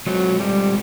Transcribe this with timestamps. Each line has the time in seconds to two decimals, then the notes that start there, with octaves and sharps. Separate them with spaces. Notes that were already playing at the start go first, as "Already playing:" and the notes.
0.07 F#3 G#3 C4 F4 A4 C5
0.40 G3